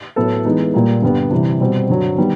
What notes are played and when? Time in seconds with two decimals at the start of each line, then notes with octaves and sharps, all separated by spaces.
0.16 A2 F#3 B3 E4 A4
0.45 E3 G#3 B3 D#4
0.74 A#2 G3 A#3
1.02 G2 D3 G3 B3
1.31 C3 E3 G3
1.60 B2 G3 C4
1.89 G2 D3 F#3
2.18 D#3 G3 B3